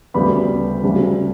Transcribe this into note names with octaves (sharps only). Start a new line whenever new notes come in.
D2 C#3 G3 B3 B5
D2 C#3 G3